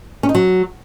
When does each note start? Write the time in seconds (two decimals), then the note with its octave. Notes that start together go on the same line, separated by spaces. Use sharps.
0.23 C#4
0.29 D#4
0.35 F#3